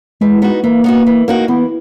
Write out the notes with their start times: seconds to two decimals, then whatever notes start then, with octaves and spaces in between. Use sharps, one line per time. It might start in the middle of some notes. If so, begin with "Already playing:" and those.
0.21 E3 G#3
0.42 B3 D#4 F#4
0.63 E3 A#3
0.84 B3 D#4 F#4
1.07 E3
1.28 A#3 D#4 F#4
1.48 E3 B3